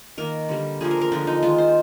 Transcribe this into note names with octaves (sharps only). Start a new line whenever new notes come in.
D#3 A#3 A#4
D3 G3 A#3
D3 F3 A#3 G#4
A#4
A#4
D3 F3 G#3 D4
D#4
D#3 G#3 F4
C5